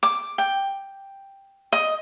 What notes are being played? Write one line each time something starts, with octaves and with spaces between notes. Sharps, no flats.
D6
G5
D#5